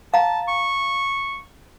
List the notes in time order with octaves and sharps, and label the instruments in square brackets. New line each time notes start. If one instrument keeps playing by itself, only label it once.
[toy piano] F5 A#5 [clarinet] A5
[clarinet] C#6